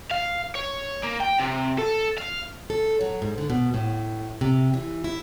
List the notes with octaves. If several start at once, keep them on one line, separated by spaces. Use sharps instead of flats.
F5
C#5
A#3
G5
C3
A4
F5
A4
F#3
G#2
D3
B2
A2
C3
E3
E4